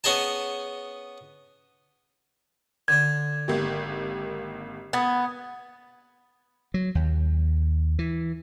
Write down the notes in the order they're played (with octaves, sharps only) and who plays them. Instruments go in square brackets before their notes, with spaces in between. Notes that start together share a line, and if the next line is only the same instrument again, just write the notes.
[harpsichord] B3 C#4 G#4 D#5 G#5 A5
[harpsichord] D3 D4 [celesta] G#6
[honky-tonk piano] G#1 A#3 G4
[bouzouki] B3 [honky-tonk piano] D#6 G#6 A6
[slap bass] F#3
D#2
E3